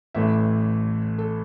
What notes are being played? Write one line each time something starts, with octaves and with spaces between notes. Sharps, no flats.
A1 A2 E3 A3 E5
A4